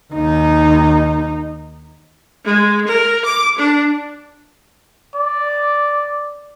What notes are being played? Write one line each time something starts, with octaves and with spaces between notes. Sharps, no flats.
D#2 D#4
G#3
A#4
D6
D4
D5